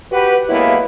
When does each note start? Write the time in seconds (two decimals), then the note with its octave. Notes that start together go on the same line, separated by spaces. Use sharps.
0.12 F#4 G4 B4
0.49 F#3 G#3 A#3 B3 E4